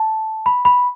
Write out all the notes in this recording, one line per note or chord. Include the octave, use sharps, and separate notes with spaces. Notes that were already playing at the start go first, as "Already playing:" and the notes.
Already playing: A5
B5
B5